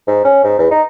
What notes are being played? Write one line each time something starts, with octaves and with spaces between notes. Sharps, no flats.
G#2
C#4
G#2
E2
D#4